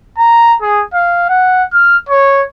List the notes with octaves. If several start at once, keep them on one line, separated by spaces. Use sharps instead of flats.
A#5
G#4
F5
F#5
F6
C#5